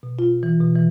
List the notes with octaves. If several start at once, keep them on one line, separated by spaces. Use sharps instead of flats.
B2
F4
E3
B2
E3